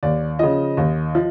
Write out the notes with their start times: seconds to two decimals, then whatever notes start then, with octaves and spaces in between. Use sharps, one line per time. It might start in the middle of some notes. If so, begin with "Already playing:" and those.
0.03 D#2 D5
0.39 C#3 F3 D#5
0.77 D#2
1.15 F3